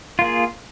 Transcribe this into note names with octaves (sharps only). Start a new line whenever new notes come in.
A#3 F4 G#4